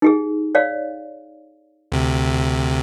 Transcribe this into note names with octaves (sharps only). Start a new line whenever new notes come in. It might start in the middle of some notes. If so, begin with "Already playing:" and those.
D#4 G4 G#4
C#5 D5 F5
D2 C3